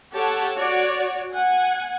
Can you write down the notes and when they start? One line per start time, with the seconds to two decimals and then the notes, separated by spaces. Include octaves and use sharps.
0.14 G4 A4 C#5 F#5 A5
0.58 F#4 C#5 D5
1.32 F#5 G#5